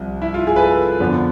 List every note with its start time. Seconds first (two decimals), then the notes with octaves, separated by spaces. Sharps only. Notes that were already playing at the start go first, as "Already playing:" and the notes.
Already playing: C2 C3 F3
0.22 E4
0.34 F4
0.47 G#4
0.56 B4
0.61 A4
1.00 F2 D3 F3 B3 D4